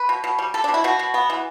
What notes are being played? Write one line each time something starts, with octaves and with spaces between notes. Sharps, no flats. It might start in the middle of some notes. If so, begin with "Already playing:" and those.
Already playing: B4
B2
B2
G3
G3 A4
D4
B2
E4
B2 F#4
B2
B3
E3